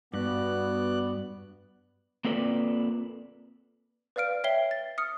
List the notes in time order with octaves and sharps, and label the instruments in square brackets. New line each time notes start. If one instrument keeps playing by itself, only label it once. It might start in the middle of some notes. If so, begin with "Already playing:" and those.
[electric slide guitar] G2 [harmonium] B3 [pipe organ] F#4 D5 F#6
[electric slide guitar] A#3 C4 F4 A4 B4 D5
[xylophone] B4 D5 F5 F6 D7
C#5 E5 G5 C7 G7
A6
D#6 F6 C#7